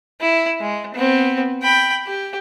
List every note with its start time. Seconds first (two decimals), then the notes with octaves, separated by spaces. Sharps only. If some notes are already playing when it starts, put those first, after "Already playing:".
0.21 E4
0.60 G#3
0.94 B3 C4
1.62 G5 B5
2.06 G4